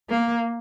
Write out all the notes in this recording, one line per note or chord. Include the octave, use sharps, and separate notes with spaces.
A#3